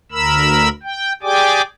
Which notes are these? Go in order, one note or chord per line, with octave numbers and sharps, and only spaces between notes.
D2 A#4 B5 E6
G5
G4 G#4 D5 G5 G#5 D6